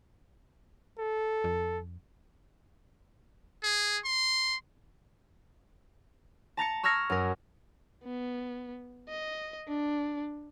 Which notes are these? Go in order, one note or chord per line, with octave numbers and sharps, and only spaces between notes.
A4
F2
G#4
C6
A5 A#5 A6 C#7
C#6 E6 F6 G#6 A#6 C#7
F#2 A#4
B3
D#5
D4